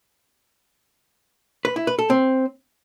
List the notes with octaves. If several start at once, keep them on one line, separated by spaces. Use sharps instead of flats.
B4
E4
B4
A4
C4